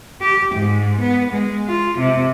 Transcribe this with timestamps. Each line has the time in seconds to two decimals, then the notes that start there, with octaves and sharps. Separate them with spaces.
0.21 G4
0.55 G#2
0.99 B3
1.31 G#3
1.67 F4
1.98 C3